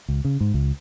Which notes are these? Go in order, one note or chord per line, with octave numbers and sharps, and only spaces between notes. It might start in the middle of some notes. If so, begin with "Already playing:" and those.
C#2
C#3
G#2
C#2